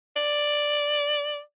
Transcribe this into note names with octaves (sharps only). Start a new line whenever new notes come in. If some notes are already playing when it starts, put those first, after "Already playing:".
D5